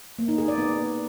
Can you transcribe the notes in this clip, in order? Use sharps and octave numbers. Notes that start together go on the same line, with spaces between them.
A#3
D#4
G#4
D5
B3